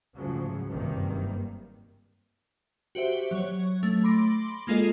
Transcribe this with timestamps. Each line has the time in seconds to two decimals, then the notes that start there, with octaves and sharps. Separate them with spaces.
0.15 D2 G#2 C#3 F3 F#3
0.69 F#1 G2 C3 D#3 G3 A#3
2.95 F#4 G4 C5 E5
3.31 F#3 C#5
3.83 A3
4.03 B5 C6 D6 A#6 D7
4.67 G#3 A#3 F4 G#4 A4 D#5